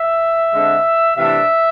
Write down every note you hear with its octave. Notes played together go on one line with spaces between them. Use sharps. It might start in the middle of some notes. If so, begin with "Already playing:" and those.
Already playing: E5
D3 G#3 C4
C3 E3 A3 D4 E5